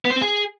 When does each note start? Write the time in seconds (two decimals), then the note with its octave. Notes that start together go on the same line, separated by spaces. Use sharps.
0.05 B3
0.10 C5
0.16 C4
0.22 G#4